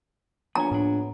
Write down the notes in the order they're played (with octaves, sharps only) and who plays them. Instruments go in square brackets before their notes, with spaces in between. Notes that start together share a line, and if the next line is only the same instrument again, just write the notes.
[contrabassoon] A#1 [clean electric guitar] B3 C#5 G#5 [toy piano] A#5
[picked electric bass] A2 D4